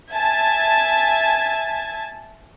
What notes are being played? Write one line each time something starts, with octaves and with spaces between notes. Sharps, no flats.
E5 G#5 A5 G#6